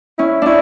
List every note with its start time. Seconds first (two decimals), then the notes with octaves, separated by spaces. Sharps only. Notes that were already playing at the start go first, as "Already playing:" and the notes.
0.18 C#4 E4
0.42 C#4 D4 E4